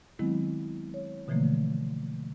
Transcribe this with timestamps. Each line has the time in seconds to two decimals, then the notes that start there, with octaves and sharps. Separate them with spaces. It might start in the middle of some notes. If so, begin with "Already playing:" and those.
0.19 D#3 F#3 G#3 B3 C4 E4
0.94 C#5
1.28 B2 D3 E3 F3 A3 A#3